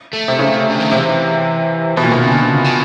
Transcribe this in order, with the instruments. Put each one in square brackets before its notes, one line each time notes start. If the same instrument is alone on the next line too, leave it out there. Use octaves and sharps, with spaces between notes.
[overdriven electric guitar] A3
[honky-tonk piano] C3
C#3
[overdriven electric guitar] D3
D#3
[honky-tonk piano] C3 [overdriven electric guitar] E3
[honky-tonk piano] B2 [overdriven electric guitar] E3
[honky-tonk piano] A#2
[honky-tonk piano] B2 [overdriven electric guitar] D#3
[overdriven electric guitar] C#3
D3
C#3
C3
C#3